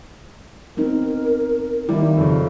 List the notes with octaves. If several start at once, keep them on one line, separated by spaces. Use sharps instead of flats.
B3 C4 D#4 A#4
D#3 G3 A#3 E4
F2 C#3